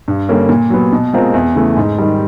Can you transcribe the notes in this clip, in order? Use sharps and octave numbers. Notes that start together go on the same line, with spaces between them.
G2
D3 G3 A#3 C#4
A#2
F#3 B3
B2
G#3 C4 F4 A#4
E2
C#3 E3 A3
G#2
D#3 G3